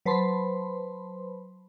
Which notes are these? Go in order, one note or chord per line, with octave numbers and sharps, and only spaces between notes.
F#3 B4 C5 A5 B5 C6